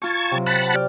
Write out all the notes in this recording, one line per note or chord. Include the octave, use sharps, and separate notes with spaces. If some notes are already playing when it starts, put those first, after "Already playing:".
F4 A5 A#5 C#6 G#6
C3 F#3
F#5 A5 B5
G4 D5 F6